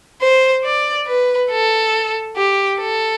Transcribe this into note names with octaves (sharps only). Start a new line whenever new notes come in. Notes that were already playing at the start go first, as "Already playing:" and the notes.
C5
D5
B4
A4
G4
A4